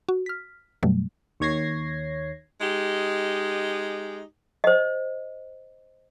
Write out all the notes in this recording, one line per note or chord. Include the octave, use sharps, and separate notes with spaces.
F#4
F6 B6
F#2 B2 F#3 G3 A3
D#2 D#3 C#5 G#6 A#6 C7
G#3 D#4 G4
C5 D#5